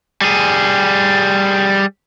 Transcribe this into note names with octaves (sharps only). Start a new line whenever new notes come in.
G3 G#4